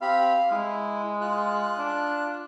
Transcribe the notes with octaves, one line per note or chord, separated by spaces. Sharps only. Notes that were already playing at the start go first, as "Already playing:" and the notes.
C4 G4 F5 B5
G#3 E4
F4 F#6
D4